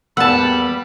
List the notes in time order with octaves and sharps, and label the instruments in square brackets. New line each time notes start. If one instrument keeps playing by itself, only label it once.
[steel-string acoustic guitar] E2 A#3 [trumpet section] G3 B5 [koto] F#5 A5 [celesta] E6